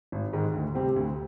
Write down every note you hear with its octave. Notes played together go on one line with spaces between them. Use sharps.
G#1
G#2 D#3 G#3
D2
C3 G3 C4 G4
D2